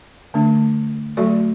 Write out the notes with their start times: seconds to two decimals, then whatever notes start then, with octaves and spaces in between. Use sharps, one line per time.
0.34 D3 A3 D4
1.17 F#3 A3 F#4 A4 D5